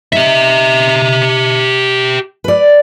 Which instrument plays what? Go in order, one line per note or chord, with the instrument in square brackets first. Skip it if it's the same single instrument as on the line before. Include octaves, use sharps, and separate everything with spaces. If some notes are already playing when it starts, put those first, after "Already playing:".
[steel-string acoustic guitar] D#4 [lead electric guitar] G4 E5
[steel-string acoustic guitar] B4 D5